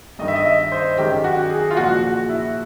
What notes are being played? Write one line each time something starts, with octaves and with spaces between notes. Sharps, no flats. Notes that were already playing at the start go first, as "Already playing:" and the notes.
G2 D#3 G3 D#5
E5
D#5
E5
C5
F#2 D#3 G#3 G4
F#4
G#4
F4
A#2 F3 G#3 F#4
F#4
E4